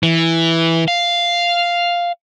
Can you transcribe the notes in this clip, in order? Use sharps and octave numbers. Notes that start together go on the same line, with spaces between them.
E3
F5